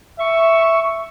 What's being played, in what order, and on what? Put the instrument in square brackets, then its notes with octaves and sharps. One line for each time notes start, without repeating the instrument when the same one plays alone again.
[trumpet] E5 [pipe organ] C#6